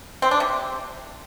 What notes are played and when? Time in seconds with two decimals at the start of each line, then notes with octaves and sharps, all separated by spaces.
0.22 C4
0.31 D4
0.40 C3